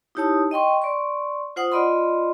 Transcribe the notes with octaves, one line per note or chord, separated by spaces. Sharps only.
D#4 E4 G4 C#5 A5 D#6
D#5 G5 C6 C#6
D5 C6 C#6
F4 C5 F#5 D#6
F4 D5 D#5 B5 C6